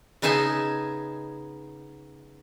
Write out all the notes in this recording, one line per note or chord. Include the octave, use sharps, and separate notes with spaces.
C#3 B3 D#4 E5 G#5 A5